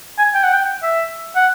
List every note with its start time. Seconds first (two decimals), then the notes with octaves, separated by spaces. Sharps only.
0.18 G#5
0.34 G5
0.44 F#5
0.53 G5
0.82 E5
1.36 F#5